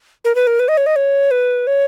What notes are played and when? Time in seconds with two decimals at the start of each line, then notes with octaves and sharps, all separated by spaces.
0.25 A#4
0.35 B4
0.47 A#4
0.60 B4
0.68 D#5
0.77 C#5
0.86 D#5
0.96 C#5
1.31 B4
1.67 C#5